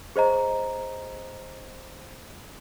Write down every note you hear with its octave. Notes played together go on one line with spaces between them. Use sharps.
G#4 C5 D#5 A#5